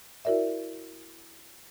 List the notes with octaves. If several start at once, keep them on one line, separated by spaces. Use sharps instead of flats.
E4 F#4 A#4 D5 E5